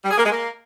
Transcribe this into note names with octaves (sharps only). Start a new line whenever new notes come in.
G3
G#4
A#3
G#3
A#3